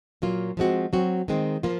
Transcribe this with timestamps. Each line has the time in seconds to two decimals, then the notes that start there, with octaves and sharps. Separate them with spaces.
0.22 A#2 F#3 A#3 F4
0.57 F3 G#3 C4 F#4
0.93 F#3 C4 F#4
1.28 D#3 G#3 C4
1.63 F3 A#3 F4